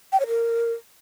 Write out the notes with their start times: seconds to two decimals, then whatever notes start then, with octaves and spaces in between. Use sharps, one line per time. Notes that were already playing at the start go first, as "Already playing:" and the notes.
0.12 G5
0.20 C#5
0.27 A#4